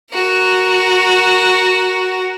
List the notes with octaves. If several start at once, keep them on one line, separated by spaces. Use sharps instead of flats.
F#4 A#4